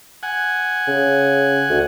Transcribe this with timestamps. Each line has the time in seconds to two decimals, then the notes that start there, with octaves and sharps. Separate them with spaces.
0.23 F#5 G#5
0.87 C#3
1.69 D2